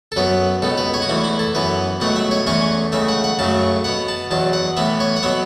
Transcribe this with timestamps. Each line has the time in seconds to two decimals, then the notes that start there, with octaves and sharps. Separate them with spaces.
0.12 A4
0.16 F#2 F#3 B3 B4
0.62 C#2 B2 B3 A4
0.77 B4
0.94 C#5
1.02 F#4
1.09 E2 E3 A3 E4
1.24 E4
1.39 A4
1.55 F#2 E3 B3 B4
2.00 C#2 B2 F#3 A3 F#5
2.16 E5
2.31 C#5
2.47 E2 E3 A3 C#4 C#5
2.92 C#2 C#3 A3 E5
3.08 F#5
3.24 F#5
3.39 F#2 C#3 F#3 A3 A5
3.84 B2 B3 F#5
4.08 A5
4.31 E2 B2 F#3 A5
4.53 F#5
4.77 A2 E3 B3 E5
5.00 C#5
5.16 F#5
5.23 B2 F#3 B3 E5